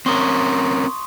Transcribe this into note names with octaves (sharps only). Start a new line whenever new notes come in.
C4 C#4 A#4 C6 C#6 D#6